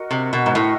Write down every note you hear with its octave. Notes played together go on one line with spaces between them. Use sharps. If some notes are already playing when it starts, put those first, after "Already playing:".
Already playing: F#4 A#4 D#5
C3
B2
G#2
A2